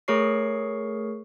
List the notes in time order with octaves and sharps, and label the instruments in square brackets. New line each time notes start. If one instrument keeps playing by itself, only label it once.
[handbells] A3 G#4 A#4 C#5 C#6 C7